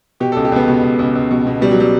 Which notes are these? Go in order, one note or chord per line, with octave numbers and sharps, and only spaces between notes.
B2 G4
A4
C#2
G4
C#2 B3
B2
C#2
C#2
C#2
B2
B2
B2 G3
F#3
G3